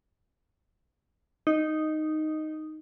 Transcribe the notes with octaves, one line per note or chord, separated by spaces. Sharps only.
D#4